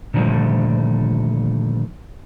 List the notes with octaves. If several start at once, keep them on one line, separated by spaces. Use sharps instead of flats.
A#2 D3 D#3 F3 G3 A3